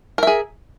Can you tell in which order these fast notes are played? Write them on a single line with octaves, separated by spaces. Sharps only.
A#4 E5 G#4